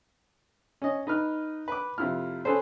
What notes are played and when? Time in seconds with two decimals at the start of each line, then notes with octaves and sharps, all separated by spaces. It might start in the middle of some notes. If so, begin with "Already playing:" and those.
0.82 C#4 D#5
1.07 D#4 B4 F6
1.68 B4 D6
1.98 F2 C3 E4 F4 F6
2.45 C#4 G#4 A4 B4 C5